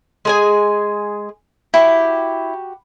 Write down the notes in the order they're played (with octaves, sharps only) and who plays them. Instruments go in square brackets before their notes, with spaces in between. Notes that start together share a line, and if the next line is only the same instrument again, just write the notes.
[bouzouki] G#3 G#4 G#5
[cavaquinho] E4 [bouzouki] F#4 G4